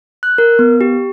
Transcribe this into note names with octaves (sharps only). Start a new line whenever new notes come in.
F#6
A#4
B3
G4